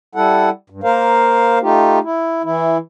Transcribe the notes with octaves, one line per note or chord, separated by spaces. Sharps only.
G3 E4 A4 F#5
G2
A#3 A#4 C5 F5
A3 D#4 F4 G4
E4
E3 E4